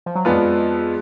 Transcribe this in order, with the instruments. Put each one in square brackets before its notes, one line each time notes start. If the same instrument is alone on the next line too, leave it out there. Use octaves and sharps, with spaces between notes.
[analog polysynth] F3
F#3
[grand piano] F2 F3 B3 D4 F4 [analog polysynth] G#3